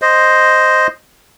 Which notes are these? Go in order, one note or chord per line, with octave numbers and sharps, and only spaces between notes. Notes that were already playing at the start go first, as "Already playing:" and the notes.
C5 D#5